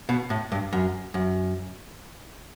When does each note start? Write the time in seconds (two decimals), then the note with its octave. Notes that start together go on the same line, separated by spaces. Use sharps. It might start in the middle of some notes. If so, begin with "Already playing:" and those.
0.09 B2
0.30 A2
0.52 G2
0.73 F#2
1.14 F#2